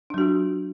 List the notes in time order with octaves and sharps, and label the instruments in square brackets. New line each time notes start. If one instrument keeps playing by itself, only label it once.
[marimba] D4
F#3
F#4
F4